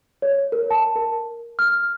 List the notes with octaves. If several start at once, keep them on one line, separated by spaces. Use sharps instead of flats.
C#5
A#4
A5
A#4
F6